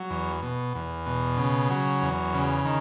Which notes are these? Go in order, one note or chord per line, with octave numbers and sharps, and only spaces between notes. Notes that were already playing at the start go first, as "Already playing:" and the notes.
Already playing: F#3
E2
B2
E2
B2
C#3
F#3
E2
C#3
D#3